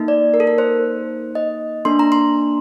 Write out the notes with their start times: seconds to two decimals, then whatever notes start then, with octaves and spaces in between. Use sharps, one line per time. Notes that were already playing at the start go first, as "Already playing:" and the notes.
Already playing: A#3 D#4 A4
0.08 D5
0.34 A#4
0.40 A4
0.47 A#4
0.58 C5
1.35 D#5
1.85 A#3 D4 A4 C6
1.99 A#5
2.12 C6